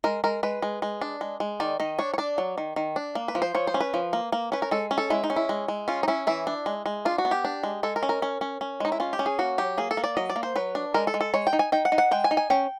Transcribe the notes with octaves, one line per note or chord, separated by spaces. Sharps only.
G#3 A#4
G#3 A#4
G#3 B4
G#3
G#3
D4
G#3
G#3
D#3 D5
D#3 D#5
D4 C#5
C#5
D4 D5
F#3
D#3
D#3
D4
A#3
B4
F3
C5
F3 C#5
C5
C#4
B4
F3
A#3
A#3
C#4 B4
A#4
G#3 A4
C#4
A4
G#3 E4
D#4
C#4
E4
G#3
G#3
C#4 F4
D#4
C#4 E4
E3 E4
D4
G#3
G#3
D4 F4
F#4
B3
G4
D4
G#3
G#3 A4
A#4
C#4
A#4
C#4
C#4
C#4
G#3 D#4
E4
C#4 F4
G4
C#4
G#4
A#3 F#4
F#3 G4
A#3 G#4
A4
A#3
D5
F#3 D#5
D5
A#3
C5
F#3 B4
D4
G#3 A#4
A4
G#3
A4
G#3 C#5
G5
D#4
G#5
D#4 G5
F#5
D#4
F#5
G#3 G5
G#5
D#4
G#5
C#4 G5